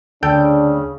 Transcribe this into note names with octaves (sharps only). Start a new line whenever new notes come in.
D2 C#3 D4 A4 G5